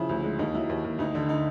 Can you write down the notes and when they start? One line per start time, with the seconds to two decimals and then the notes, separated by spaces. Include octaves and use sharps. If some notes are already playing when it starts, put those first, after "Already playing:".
Already playing: C#3 F3 E4
0.09 D2
0.24 G#3
0.39 D#2 D#4
0.54 F#3 E4
0.69 D#2
0.84 D#2
0.99 D2 D#4
1.15 D3
1.29 D#4